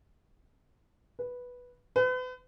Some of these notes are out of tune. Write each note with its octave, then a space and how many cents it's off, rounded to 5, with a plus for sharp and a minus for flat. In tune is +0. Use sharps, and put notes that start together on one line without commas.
B4 -5
B4 +40